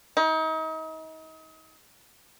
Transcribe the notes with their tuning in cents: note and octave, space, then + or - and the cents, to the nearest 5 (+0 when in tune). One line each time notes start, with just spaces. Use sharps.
D#4 +35